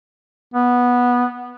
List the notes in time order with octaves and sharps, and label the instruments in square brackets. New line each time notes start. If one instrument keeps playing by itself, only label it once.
[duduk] B3